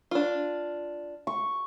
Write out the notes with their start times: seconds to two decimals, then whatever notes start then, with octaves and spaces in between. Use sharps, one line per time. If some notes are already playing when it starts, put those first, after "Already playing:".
0.11 D4 F4
1.27 C#6